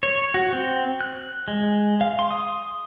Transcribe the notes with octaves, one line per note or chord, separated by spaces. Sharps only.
C#5
F#4
C4
F#6
G#3
F5
C6
D#6